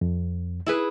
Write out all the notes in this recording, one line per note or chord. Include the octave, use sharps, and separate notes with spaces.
F2
E4 G#4 B4